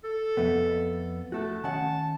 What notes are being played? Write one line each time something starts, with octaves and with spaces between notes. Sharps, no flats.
A4
F2 A3 B3
A3 F#4 A4
D#3 C#4 F#5 A5